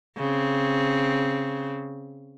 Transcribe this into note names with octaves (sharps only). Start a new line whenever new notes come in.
C#3 C4